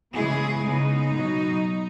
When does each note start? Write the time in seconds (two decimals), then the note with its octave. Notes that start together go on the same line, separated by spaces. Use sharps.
0.14 C#3 E3 G#3 B3 E4 G#4
0.64 C#3 G#3 B3 D#4
1.14 B2 F#3 B3